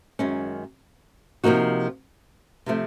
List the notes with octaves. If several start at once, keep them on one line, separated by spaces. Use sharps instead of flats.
F#2 D#3 G#3 C#4
C3 F3 A#3 D#4 F#4
C3 F3 A3 C4